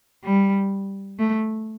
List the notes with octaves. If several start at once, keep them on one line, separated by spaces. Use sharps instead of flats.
G3
A3